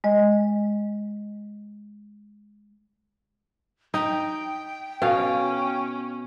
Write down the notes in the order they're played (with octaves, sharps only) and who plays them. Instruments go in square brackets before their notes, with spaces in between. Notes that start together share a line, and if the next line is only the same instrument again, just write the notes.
[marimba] G#3 D#5
[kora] D#4 [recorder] G5
[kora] B2 [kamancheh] C#4 [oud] F5